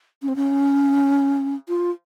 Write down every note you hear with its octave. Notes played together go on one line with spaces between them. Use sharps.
C#4
C4
C#4
F4